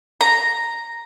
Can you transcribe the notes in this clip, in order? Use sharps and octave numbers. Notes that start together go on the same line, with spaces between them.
A#5